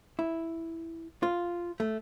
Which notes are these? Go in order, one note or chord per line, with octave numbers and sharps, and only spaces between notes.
E4
F4
A3